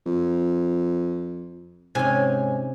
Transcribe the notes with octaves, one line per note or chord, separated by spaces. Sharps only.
F2
G#2 C3 C#4 G#5